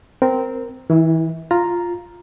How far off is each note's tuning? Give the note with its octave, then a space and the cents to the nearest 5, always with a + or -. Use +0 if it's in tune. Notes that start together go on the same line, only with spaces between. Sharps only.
C4 -10 A#4 +0
E3 -30 E4 +10
F4 +0 A#5 +0